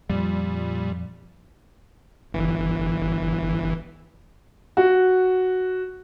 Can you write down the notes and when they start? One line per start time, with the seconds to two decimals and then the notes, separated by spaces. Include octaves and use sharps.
0.10 F2 A#2 G3
2.33 G1 E3
4.77 F#4